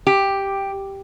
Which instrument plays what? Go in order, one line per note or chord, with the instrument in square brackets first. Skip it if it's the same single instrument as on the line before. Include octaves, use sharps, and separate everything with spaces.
[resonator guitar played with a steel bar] G4